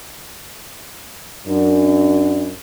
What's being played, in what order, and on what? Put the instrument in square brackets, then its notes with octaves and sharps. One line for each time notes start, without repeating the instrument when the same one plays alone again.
[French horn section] F#2 D4